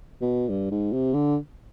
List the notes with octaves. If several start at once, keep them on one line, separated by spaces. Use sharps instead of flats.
B2
G2
G#2
C3
D3